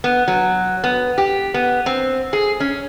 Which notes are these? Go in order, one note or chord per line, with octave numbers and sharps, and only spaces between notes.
B3
F#3
B3
G4
B3
C4
G#4
C#4